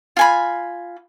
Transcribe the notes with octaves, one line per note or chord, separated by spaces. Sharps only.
F4 G#5 B5